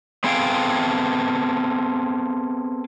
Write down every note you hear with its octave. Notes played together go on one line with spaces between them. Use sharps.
B3 C4 G#4 A4 F5 G5